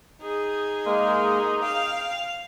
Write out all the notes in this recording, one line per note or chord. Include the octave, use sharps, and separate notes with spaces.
D#4 G#4
G#3 A#3
F5 G5